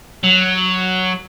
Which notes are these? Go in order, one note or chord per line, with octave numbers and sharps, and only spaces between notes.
F#3